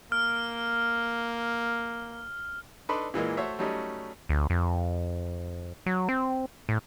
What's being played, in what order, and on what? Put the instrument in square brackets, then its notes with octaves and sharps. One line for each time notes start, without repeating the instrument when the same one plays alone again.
[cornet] A#3 [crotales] F6
[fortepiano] D4 D#4 A4 B4 D5 C6
A#2 E3 G#3 A#3
A3 F#4 C5 C#5 E5
F#3 G3 A3 C#4 D#4
[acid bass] D2
F2
F#3
C4
A2